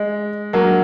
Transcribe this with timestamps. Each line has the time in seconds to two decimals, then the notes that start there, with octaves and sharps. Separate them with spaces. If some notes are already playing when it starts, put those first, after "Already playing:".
Already playing: G#3
0.53 F#3 A#3